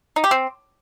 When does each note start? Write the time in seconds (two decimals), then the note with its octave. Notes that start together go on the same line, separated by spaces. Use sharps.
0.16 D#4
0.24 G4
0.31 C4